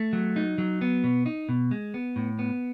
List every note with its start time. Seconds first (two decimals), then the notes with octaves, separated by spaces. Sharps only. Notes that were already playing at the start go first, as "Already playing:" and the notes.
Already playing: A3
0.13 F#3
0.36 D#4
0.58 F#3
0.81 B3
1.04 B2
1.26 D#4
1.49 B2
1.71 G#3
1.94 B3
2.16 A2
2.39 B3